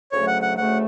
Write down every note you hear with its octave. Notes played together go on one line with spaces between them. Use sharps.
D2 C#3 F#3 A3 C#5
F#5
F#5
D2 C#3 F#3 A3 F#5